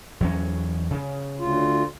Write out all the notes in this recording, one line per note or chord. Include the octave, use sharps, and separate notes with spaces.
E2 F#3 C#4
C#3
D2 F4